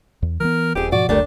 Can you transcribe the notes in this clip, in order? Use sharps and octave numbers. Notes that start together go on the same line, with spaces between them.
E2
E3 F#3 B3 A#4
D#1 F2 G4 G#4
G#2 B2 F3 F#4 D5
F#1 D2 G3 A3 D4 A#4